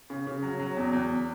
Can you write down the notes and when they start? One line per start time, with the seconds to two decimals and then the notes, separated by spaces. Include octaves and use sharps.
0.10 C#3
0.27 C#3
0.43 F#3
0.60 F#3
0.77 E2
0.93 E2